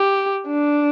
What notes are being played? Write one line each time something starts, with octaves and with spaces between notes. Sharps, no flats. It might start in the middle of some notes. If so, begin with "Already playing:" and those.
Already playing: G4
D4